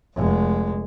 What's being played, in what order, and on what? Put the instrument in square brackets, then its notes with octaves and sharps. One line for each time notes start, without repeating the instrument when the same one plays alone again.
[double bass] F1 G#3